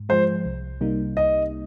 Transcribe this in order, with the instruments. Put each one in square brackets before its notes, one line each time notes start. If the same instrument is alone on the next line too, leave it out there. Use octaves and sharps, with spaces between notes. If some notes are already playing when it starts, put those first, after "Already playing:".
Already playing: [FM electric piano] G#2
[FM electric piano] F3 G#3 [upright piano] C5
[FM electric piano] C2
C3 G3 A#3 D#4
[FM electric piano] C2 [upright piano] D#5